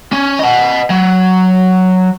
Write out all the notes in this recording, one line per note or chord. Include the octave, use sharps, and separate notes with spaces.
C#4
D#5 F#5
F#3